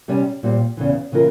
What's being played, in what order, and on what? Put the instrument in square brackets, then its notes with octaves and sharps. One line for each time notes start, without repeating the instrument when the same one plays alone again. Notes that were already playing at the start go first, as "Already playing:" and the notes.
[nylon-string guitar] C3 G3 C#4
A#2 G3 C4
E2 C#3 E3
C#3 E3 A#3 F4 A#4